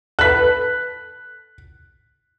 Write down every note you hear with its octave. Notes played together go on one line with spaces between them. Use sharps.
A4 B4 F#6 B6